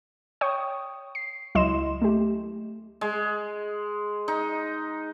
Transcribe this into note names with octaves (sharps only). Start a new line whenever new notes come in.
C#5 G5 C#6 D#6
C7
C#2 F#3 E4 D#5 C6 E7
A3 G4
G#3
D#4